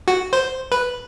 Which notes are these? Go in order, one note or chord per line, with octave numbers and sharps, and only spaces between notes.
F#4
C5
B4